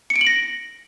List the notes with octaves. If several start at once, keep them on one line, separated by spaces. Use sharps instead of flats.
C#7
D7
F#7
A#6